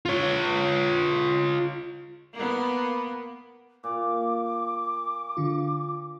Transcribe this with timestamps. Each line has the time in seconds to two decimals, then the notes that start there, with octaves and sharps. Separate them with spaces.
0.05 F4 C#5
2.34 A#3 B3
3.84 A#2 D6
5.37 D3 F4